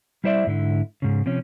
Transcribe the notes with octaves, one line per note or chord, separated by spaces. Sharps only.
G3 E4 C5 D5 E5
G#2 D3 E4
G#2 C#3
C3 F3 C#4